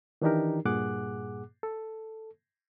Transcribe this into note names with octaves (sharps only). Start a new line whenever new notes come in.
D#3 E3 D4 D#4 G4 A#4
G2 A#2 G#4 F#5 D6 F#6
A4